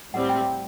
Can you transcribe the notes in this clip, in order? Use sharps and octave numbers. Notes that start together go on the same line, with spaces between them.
A2 G3 C4 F#5
G5